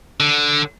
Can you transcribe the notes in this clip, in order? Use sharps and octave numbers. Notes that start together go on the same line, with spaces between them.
D3